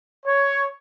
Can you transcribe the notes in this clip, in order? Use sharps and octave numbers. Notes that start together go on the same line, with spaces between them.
C#5